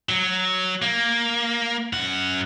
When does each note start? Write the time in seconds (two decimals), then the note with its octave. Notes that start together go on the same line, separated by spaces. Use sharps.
0.09 F#3
0.82 A#3
1.93 F#2 F#5